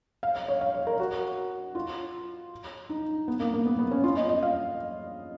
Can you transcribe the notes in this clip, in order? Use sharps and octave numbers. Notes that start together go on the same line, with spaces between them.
F5
F5
C#5
F5
C#5
A#4
F#4
F4
D#4
B3
A#3
A#3
B3
B3
C#4
F4
D#5
D#5
F5